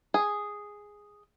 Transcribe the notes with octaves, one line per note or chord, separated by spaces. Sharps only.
G#4